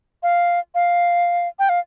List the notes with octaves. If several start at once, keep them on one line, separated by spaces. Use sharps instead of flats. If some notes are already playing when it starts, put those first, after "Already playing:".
F5
F5
G5
F5